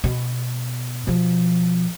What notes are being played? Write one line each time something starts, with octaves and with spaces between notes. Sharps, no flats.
B2
B2 F3